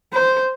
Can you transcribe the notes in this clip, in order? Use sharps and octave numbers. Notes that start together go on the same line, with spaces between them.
C5